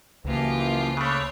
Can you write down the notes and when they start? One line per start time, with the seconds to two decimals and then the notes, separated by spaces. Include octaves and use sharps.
0.25 C#2 F#2 E3 F3 A#3 F4 G4
0.97 C#3 A3 C5 C#5 B5 D6 F#6